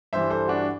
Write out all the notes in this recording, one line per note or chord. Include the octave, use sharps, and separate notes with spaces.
G2 E3 G3 C5 E5
A4 C5
D4 F#4